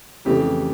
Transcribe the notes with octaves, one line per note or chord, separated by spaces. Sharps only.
F2 C#3 E3 A3 G4